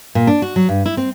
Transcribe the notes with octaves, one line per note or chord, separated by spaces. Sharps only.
A#2
D4
F#4
F#3
G2
E4
C4